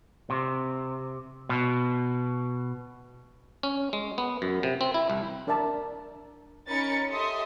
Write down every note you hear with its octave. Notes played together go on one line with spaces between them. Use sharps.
C3
B2
C#4
G#3
B3
F#2
C3
C4
E4
C2
D4 A#4 D5 E5 A5
C#4 D#4 A#4 B5 A6 C#7
G4 A4 D#5 E5 C6 D#6